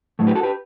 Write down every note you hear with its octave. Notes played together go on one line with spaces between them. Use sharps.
A2 F#3 A3
G4 B4
F#4 A4
G4 B4